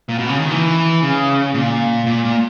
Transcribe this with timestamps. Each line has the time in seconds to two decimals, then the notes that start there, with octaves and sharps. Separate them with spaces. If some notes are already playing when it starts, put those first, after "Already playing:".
0.09 A#2
0.19 B2
0.29 C#3
0.39 D#3
0.51 E3
1.03 C#3
1.54 A#2
2.07 A#2
2.25 A#2